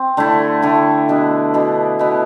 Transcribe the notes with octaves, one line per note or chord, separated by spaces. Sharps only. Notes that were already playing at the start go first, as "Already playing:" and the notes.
Already playing: C4
D3 A3 E4
D3 A3 E4
B2 B3 D4
B2 B3 D4
B2 B3 E4